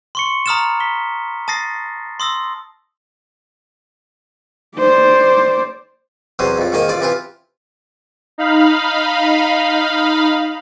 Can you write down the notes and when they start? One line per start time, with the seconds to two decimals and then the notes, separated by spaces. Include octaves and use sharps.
0.15 C6 C#6 C#7
0.46 A#5 B5 D#6 F6 A6 E7
0.80 B6 G7
1.48 A5 D#6 A6 A#6 C7
2.20 C6 D#6 E6 A#6
4.77 C5 D5
6.39 E2 C3 F#3 C5 D#6
6.58 F2 A2
6.72 G#2 D#3 A#3 D#5 A#5
6.88 A1 F4 D5
7.01 C3 E3 F4 G4
8.38 D#4 F5 B5